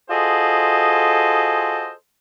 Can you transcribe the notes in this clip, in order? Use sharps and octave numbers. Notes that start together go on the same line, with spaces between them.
F4 F#4 G#4 A4 C5 D#5